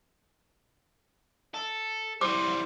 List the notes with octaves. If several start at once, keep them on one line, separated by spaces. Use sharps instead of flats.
A4
E3 G3 C5 D6